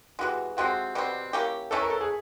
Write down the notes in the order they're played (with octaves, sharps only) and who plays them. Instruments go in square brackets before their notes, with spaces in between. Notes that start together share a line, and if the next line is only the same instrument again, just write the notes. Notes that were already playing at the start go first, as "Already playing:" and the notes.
[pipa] C3 E3 G#3 [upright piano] F#4
[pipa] C3 F3 G#3 C4 [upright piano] F#4
[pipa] B2 G3 C4
A#3 C#4 E4 G4
[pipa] E3 A3 C#4 E4 [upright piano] A4
[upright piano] A#4
A4
G#4